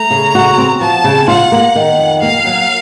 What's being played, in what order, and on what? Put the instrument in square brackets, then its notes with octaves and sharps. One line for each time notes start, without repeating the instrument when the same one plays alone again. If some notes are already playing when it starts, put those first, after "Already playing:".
Already playing: [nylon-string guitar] A3 [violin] A#5
[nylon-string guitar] C#3
F#4
C4
[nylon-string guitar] F3 [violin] A5
[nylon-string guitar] C#3
[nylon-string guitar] F4 [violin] F#5
[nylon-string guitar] A#3
D#3
F2
[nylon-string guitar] A#3 [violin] F5
[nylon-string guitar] F#3